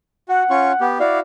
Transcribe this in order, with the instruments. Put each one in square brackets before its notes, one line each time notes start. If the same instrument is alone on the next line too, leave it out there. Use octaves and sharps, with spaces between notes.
[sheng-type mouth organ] F#4 [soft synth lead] F#5
[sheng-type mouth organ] C#4 F4 C#6
B3 G4
[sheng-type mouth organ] E4 F#4 F5 [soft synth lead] D5